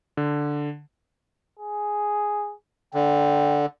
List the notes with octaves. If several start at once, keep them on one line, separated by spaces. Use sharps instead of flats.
D3
G#4
D3 G5